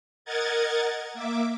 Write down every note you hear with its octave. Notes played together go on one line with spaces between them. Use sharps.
A#4 D#5 F#5 G#6 A6
A#3 E5 D6